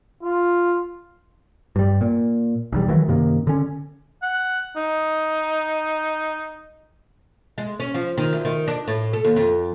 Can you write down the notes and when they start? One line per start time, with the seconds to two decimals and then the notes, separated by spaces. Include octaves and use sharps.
0.23 F4
1.76 G2 G3
2.01 A#2
2.72 B1 E2 G3
2.88 D#3 E3 F#3 A3
3.09 F#2 C3 D#3 A#3
3.47 D3 C#4
4.22 F#5
4.76 D#4
7.58 G#3
7.80 C#4
7.94 F3
8.18 D#3
8.33 D2
8.45 D#3
8.68 D4
8.88 A2
9.13 A4
9.25 D#2
9.36 F2